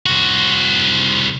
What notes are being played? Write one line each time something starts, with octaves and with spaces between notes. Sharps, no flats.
C2 F#4